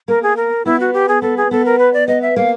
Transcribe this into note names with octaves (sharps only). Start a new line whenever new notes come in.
A#3 A#4
G#4
A#4
B3 E4
F#4
G4
G#4
B3 A4
G#4
B3 A4
A#4
B4
D5
B3 D#5
E5
A#3 F5